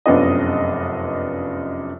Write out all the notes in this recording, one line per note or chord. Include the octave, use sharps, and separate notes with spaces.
F1 F#2 B3 D4 F4 D#5